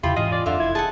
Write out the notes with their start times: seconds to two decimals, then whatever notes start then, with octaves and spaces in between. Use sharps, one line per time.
0.03 E2 C#3 E4 F4 G4 B5 C6
0.16 G#2 E3 C#4 F4 G#4 D#5
0.32 D5
0.46 F2 D3 E5 F5 C6
0.60 F1 E4 G#6
0.75 G#4 A4 F#5 A5